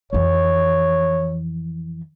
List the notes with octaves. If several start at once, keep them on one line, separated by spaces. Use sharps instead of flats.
F2 E3 C#5